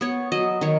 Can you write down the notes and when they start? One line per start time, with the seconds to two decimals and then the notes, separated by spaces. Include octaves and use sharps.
0.01 B3 C#5
0.32 F#3 D#5
0.61 D#3 C#5